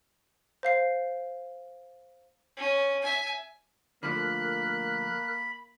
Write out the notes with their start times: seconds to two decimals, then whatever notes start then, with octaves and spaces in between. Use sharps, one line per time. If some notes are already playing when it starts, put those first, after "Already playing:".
0.63 C5 F5 C7
2.57 C#4
3.02 E5 G#5
4.03 D3 F3 A3 A#3 A#4 B5 F#6